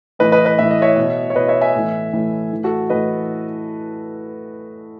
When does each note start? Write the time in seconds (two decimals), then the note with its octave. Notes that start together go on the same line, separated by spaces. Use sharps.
0.19 A2 E3 B4 D#5
0.32 B4 D#5
0.45 B4 D#5
0.58 A2 E3 E5
0.71 D#5
0.82 C#5 E5
0.96 B2
1.30 C#5
1.35 B2 B4 D#5
1.48 C#5 E5
1.61 E5 G#5
1.75 A2 E3
2.13 A2 E3
2.52 A2 E3
2.64 F#4 A4
2.90 A2 E3 B4 D#5